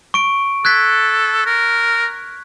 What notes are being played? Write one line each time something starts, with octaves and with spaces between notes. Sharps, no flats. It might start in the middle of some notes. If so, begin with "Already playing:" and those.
C#6 D7
A4 F#6 G#6 B6
A#4